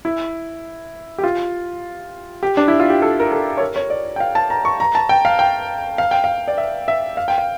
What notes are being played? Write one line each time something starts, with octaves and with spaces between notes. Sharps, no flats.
E4
G4
F4
G4
D4
E4
F4
G4
A4
A#4
A4
C#5
A#4
C#5
D5
G5
F5
A5
A#5
C#6
A#5
A5
G5
F5
G5
F5
G5
F5
D5
E5
E5
F5
G5
F5